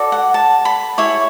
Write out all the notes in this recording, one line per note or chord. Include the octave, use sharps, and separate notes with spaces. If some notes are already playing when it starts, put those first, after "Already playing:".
Already playing: F#4 A4 D5
F#5
A5
B5
E4 G#4 C#5 C#6